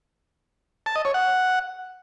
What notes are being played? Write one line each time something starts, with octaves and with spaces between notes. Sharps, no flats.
A5
D#5
C#5
F#5